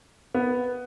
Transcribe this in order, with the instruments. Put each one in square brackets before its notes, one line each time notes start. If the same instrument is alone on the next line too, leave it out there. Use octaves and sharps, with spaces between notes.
[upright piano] B3